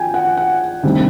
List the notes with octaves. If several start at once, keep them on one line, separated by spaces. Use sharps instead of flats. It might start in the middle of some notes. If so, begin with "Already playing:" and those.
Already playing: F3 G5 G#5
F#5
F#5
D2 C3 D#3 G3